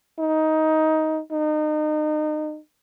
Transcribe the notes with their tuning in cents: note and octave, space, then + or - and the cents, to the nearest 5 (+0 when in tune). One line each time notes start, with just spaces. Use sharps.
D#4 +15
D#4 -30